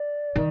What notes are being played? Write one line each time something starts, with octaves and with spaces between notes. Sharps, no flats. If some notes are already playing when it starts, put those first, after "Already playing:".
Already playing: D5
D#3